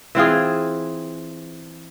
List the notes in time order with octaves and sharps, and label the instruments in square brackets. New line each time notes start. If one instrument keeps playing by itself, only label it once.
[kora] E3 C4 F4 G#4